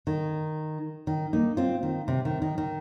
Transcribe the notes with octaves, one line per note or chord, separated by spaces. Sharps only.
D#3
D#3
A#3 D#4
C4 F4
D#3
C3
D#3
D#3
D#3